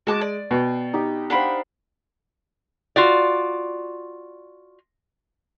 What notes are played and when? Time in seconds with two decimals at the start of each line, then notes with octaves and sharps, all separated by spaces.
0.07 G#3 F#4 A5 D6
0.21 D5
0.51 B2 G5
0.93 D#4 G4 G5
1.30 D4 G4 C5 F5 F#5 B5
2.96 F4 F#4 D5